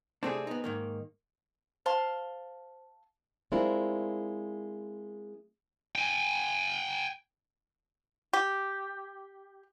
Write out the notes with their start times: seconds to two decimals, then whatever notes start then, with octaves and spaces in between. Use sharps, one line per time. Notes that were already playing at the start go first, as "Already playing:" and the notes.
0.23 C3 A3 C4 D4 G#4
0.47 B3 D#4
0.64 G#2 D#3 A#3
1.86 C5 F5 A5 C6
3.52 G#3 C4 D4 E4 F4 A#4
5.96 G5 G#5
8.33 G4